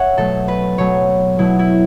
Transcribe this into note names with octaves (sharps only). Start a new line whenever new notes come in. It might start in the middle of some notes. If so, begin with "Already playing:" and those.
Already playing: C#5 E5 F#5
B2 F#3 A3 A4
B4
B2 F#3 A3 C#5
B2 F#3 A3 E4
E4